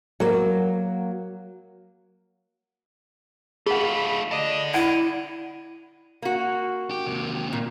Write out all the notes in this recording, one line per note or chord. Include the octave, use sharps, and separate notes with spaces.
F#3 A#3
A3 F4 G#4 F#5 B5
A4 D5 D#5
E4 F#5 D#7
A#3 F#4
G4
D#2 C3
A#2